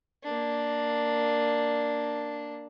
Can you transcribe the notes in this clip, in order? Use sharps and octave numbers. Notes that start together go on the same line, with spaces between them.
A#3 D4